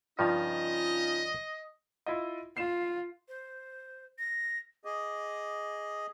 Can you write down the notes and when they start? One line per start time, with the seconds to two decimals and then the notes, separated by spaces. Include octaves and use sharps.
0.19 G2 C#3 F3 C#4 D#4 F4 D#5
2.07 E4 F4 D#5
2.57 F4 C7 E7
3.29 C5
4.19 A#6
4.85 G#4 D#5 D6